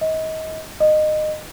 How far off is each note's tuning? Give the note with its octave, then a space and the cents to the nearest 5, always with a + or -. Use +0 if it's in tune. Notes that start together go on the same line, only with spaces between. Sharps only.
D#5 +30
D#5 -20